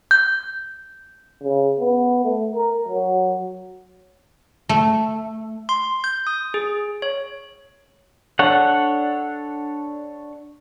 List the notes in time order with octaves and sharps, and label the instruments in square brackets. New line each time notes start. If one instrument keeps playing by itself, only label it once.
[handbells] G6
[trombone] C#3
B3
A3
A#4
F#3
[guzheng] A3
[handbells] C6
G6
D#6
G#4
C#5
[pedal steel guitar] D4 A4 C#5 F#5